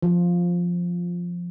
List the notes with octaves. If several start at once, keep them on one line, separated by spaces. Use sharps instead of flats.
F3